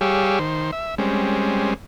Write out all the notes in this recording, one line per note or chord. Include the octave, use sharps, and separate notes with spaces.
G3 G4 G#4 C#5 F5 E6
D#3 C5
E5
G3 G#3 C4 C#4